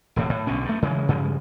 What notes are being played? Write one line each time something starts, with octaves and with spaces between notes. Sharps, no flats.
E1 A2 C3
A2
B1 B2 D3 C#4
G2 A3
C#3 E3 F#3 G#3
G2 C#3 F3 G#3